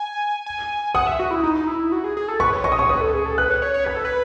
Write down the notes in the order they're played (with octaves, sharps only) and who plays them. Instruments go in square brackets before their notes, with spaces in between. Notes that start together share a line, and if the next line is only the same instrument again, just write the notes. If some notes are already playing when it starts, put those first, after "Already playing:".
Already playing: [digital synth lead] G#5
G#5
[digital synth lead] F#5 [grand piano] D#6
[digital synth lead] E5
F#4
E4
D#4
E4
F#4
G#4
G#4
A4
[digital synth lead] B4 [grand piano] C#6
[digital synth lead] C#5
[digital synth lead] D#5 [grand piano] C#6
[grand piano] D#6
[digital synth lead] C#5 [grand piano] C#6
[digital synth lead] B4 [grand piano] D#6
[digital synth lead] A4
G#4
A4
[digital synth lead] B4 [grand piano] F#6
[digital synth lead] C#5
C#5
C#5
[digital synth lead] B4 [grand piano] G#6
[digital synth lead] A4
B4